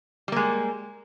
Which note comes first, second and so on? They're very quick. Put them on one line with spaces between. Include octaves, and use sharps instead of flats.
G3 A#3 G#3